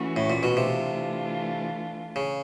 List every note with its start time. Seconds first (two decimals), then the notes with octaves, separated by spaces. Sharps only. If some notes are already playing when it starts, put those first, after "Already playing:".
Already playing: E3 A3 C#4 F#4
0.16 A2
0.30 A#2
0.43 B2
0.57 C3 E3 A3 D4 F4
2.16 C#3